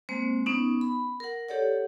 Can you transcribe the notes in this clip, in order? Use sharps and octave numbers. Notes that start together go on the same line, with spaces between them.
G#3 A#3 C4 C5
B3 C#4 D#4
B5
A#4 F#5
G4 A4 C#5 D5 F#5